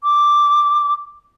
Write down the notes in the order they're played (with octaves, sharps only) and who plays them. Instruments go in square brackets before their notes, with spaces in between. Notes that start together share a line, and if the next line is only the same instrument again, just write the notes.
[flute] D6